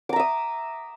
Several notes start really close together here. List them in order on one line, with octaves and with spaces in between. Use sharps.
D6 A#5 E5 D#6